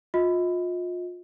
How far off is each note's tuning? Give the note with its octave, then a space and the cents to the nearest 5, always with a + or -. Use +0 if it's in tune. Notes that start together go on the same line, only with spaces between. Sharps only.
F4 +30 D#5 +35